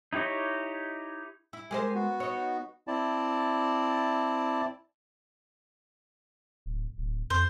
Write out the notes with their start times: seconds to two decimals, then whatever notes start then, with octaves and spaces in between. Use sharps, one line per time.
0.13 D#4 E4 G4 C#5 D#5
1.53 E4
1.71 G#3 G4 A#4 C5 G#5
1.95 B3 F#4
2.20 D#4 C#5
2.87 C4 E4 D5 A5
6.66 D1
6.98 D1
7.30 F2 C5